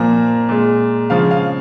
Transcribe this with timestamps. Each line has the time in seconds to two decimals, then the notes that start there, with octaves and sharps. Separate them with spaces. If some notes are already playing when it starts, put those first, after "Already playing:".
Already playing: A#2 F3 A#3 A#5
0.49 A#2 G#3
1.10 C#3 F3 G#3 F5
1.31 F5